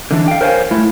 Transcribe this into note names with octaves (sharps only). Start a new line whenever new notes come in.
D3 E3 D4
F5 G5
A#4 C5 C#5 D#5 F5 G#5
A3 E4